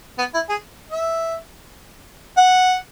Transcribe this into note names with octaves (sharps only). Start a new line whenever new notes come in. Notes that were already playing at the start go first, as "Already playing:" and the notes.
B3
E4
G#4
E5
F#5